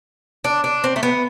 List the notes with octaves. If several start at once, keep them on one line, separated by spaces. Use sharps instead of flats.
D4
D4
C4
A3
B3